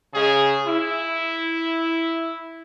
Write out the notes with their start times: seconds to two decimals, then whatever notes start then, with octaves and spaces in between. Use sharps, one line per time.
0.14 C#3 G#4
0.67 E4